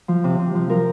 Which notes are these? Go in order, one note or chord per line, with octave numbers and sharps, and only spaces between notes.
F3
C3
C3
F3
F3 A#4